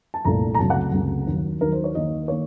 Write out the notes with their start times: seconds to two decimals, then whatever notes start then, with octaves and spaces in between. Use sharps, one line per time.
0.14 A5
0.25 C2 A#2 A3 A#5
0.54 A#5
0.59 C#2 C3 F#3 A3 A5
0.70 F#5
0.92 C#2 C3 F#3 A3
1.27 D#2 D#3 F#3
1.61 D#2 D#3 F#3 A#4
1.72 C5
1.84 C#5
1.95 D#2 D#3 A#3 D#5
2.28 D#3 A#3 C#5